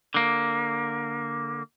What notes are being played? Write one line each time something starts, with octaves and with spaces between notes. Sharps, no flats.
D3 A#3